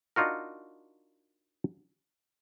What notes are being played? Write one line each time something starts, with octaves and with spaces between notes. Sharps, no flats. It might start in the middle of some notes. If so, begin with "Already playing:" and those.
D4 D#4 F4 F#4 A#4